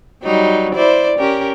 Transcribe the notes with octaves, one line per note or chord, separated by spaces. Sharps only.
F#3 G3 D#4
E4 C5 D5
C#4 G4 A#4